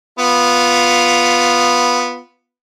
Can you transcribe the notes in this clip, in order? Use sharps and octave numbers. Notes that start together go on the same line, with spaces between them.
B3 F4